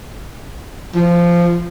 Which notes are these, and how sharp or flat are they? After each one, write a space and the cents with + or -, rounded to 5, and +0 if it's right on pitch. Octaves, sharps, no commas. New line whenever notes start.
F3 -15